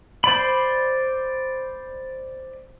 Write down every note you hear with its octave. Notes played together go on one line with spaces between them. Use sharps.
C5 D5 B5